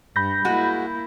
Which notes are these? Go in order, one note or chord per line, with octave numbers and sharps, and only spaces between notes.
G2 B5 G6 A#6
G#3 A#3 E4 F#4